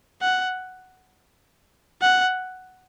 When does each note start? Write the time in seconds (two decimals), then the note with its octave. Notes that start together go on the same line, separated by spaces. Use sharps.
0.22 F#5
2.02 F#5